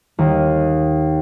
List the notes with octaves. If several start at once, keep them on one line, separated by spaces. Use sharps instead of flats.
D#2